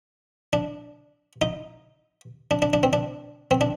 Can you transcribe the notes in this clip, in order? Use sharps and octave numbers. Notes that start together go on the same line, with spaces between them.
D4
D#4
D4
D4
D4
C4
D4
C4
D4